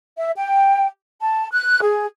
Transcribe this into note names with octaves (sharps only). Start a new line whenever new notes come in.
E5
G5
A5
F#6
G#4